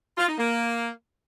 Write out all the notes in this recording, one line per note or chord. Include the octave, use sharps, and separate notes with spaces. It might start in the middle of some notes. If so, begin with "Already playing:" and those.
F4
D#4
A#3